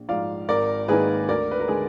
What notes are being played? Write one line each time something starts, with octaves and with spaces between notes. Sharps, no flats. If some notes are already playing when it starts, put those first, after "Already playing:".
Already playing: A#1
G#2 F3 D5 F5
G#1 A#4 D5
G#2 D#3 A#3 D#4 G#4 B4
D2 A#4 D5
B4
A#4
D3 G#3 G#4